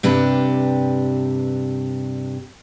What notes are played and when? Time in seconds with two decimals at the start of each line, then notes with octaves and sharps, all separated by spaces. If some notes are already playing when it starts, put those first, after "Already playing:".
0.03 G2 C3 D4 G4 B4